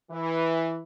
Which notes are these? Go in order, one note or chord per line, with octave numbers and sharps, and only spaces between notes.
E3